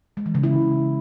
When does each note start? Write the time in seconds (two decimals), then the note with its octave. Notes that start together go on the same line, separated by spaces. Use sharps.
0.17 G#3
0.26 E3
0.35 C#3
0.43 E4